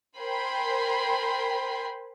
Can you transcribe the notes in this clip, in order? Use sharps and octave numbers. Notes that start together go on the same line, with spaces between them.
A#4 C5 G5 G#5 B5 C6